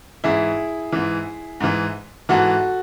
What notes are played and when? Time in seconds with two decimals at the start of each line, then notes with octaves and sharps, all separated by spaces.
0.24 G#2 E3 E4 G#4
0.92 G#2 E3
1.60 G#2 E3
2.29 G#2 E3 F#4 A4